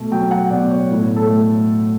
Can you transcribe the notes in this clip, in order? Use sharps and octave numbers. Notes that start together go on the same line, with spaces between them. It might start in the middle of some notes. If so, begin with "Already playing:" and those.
Already playing: B2 A3
F#3 G5
F#5
B2 D5
C#5
A2
A4
A3